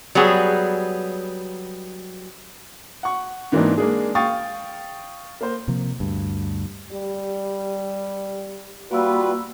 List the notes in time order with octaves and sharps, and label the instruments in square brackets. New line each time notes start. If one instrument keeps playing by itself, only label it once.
[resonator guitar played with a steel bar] F#3 G3 B3 G#4
[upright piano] F#5 C#6
G#2 E3 A#3 C4 D4 D#4
G#3 A#3 D4 G#4
F5 G5 C#6 D#6 A6
A#3 C5
[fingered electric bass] C3 F3 A#3
D2 G2
[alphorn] G3 [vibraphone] G4
[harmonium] G3 F4 B4 [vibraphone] A#3 E6 [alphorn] F#4